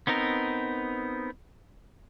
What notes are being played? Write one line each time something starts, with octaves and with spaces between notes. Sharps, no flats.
B3 C4 D#4 A#4